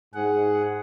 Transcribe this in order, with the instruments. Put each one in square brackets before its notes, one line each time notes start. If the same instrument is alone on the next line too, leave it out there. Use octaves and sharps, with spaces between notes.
[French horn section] G#2 [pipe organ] G#4 F#5